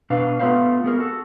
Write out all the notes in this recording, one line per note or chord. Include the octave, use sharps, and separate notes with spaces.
B2 D4 B4 F5
A3 B3 F4 B4 C5 F5
B3 G#4 A#4
F#4 A4